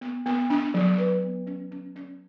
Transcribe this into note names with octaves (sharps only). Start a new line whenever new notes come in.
B3
B3
D4
F#3
B4
B3
C#4
C#4
C#4